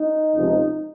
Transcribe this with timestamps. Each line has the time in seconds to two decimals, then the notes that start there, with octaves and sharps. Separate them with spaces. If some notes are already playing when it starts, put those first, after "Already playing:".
Already playing: D#4
0.36 C#2 C3 F3